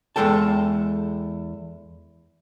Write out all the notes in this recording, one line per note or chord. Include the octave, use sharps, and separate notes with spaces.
E2 G#3 A4 G5 A5